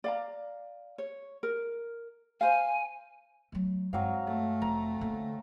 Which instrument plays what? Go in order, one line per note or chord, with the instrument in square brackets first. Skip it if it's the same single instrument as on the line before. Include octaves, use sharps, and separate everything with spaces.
[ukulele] D5 F5 A#5
C#5
A#4
[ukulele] C5 F5 [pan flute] G#5
[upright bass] F#3 A3
[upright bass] G2 G#3 [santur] F#3 C4 F5
[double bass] A3
[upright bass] F1 F2 [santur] A#5
[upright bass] D3 A#3